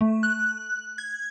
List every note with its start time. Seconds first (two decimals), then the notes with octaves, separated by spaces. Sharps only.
0.01 A3
0.23 F#6
0.98 G#6